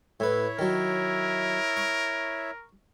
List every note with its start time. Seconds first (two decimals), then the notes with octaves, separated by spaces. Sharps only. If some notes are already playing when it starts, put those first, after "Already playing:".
0.20 A2 E4 B4 C#5 E5
0.59 D#3 F#3 A#4
1.77 C#6